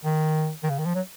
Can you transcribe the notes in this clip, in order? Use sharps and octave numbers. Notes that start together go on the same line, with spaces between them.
D#3
D#3
C#3
D#3
F3
F#3